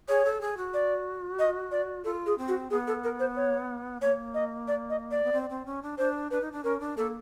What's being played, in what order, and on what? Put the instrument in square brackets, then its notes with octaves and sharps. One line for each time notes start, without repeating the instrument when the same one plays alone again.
[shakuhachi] G#4 [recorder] C#5
[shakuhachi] A4
G#4
F#4
[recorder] D5
D#5
D5
[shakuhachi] F4 [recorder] A4
[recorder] G#4
[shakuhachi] C4
[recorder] F#4
[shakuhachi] B3 [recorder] G#4
[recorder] A4
A#4
C5
C#5
[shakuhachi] A#3 [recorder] C#5
[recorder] D#5
D5
D#5
D5
[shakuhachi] B3
C4
C4
C#4
D4
[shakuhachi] D4 [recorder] C5
[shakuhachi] D4 [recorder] B4
[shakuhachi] D#4
D4
[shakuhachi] C#4 [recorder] A#4
[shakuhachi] D4
[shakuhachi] A#3 [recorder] A4